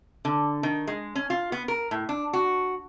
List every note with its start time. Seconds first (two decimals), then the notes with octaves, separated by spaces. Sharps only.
0.25 D3
0.63 D#3
0.87 G#3
1.15 C#4
1.30 F4
1.52 B3
1.68 A#4
1.91 A2
2.09 D4
2.33 F#4